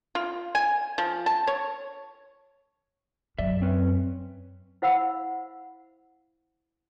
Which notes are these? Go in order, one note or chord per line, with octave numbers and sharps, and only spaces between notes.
F4
G#5
F3
A5
C#5
F#2 D5 E5
C4 C#4 B4
E4 C5 F5 F#5 B5 E6